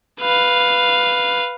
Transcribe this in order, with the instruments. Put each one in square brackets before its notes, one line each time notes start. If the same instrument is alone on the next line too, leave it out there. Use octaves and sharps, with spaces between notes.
[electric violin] B4 F5